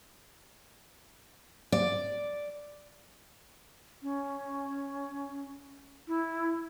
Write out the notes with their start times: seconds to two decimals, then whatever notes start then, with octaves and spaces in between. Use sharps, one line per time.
1.72 D5
4.02 C#4
6.08 E4